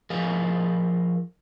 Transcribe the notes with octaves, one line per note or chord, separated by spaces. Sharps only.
F3 G#4 A#4 D#5 F5 G#5